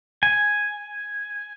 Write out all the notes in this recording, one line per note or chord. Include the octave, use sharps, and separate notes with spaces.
G#5